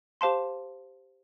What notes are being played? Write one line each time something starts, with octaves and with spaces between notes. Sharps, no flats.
G4 C5 F5 A5 C6